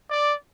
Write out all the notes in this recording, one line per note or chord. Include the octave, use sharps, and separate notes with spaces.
D5